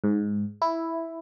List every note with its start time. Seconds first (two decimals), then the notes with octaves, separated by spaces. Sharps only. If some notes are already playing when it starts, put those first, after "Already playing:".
0.04 G#2
0.62 E4